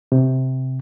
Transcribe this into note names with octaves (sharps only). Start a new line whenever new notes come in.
C3